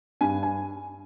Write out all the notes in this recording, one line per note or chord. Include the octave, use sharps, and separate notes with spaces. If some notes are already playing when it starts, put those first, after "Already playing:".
G2 G#5
G#5